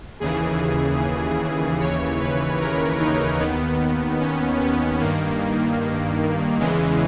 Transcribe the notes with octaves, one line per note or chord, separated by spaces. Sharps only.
D#2 C#3 E3 G#4
D#2 C#3 E3 C#5
B4
A#4
D#4
D#2 D#3 B3
C#4
B3
G2 D#3 A#3
E2 C#3 E3 G#3